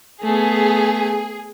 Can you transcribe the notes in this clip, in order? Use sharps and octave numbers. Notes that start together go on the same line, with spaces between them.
A3 B3 G#4